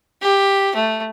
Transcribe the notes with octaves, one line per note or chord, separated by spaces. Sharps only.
G4
A3